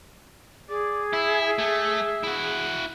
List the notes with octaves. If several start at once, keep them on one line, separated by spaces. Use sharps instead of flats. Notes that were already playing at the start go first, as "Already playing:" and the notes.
G#4 D5
E4 E5
A3
E4 F#4